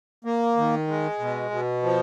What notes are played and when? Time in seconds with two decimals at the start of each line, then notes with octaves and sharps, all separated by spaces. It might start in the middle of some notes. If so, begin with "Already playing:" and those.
0.25 A#3
0.57 D#3
0.88 G#3
1.19 B2
1.51 B2
1.82 F3